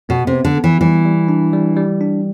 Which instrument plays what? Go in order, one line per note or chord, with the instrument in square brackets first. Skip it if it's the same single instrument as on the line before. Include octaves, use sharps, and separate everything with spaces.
[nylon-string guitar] B2 [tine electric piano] B3
[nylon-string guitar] C3
[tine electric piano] B3
[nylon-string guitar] D3
[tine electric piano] B3
[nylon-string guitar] E3
[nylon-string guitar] E3 [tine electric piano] G3
[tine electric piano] G3
D4
G3
G3
D4